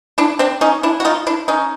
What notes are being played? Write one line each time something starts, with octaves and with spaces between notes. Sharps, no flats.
D4 E4
C4 D4
C#4 D#4
D4 E4
F#4
D#4 F4
D4 E4
C#4 D#4